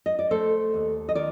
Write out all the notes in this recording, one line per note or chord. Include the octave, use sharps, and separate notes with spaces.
D#5
D5
A3 A4 C5
D#2
D#5
D#3 A#4 D5